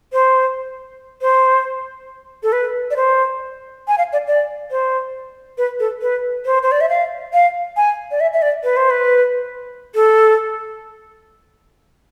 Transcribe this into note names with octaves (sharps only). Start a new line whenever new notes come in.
C5
C5
A4
B4
D5
C5
G#5
F5
D5
D5
C5
B4
A4
B4
C5
C5
D5
E5
F5
F5
G#5
D5
E5
E5
D5
B4
C5
B4
A4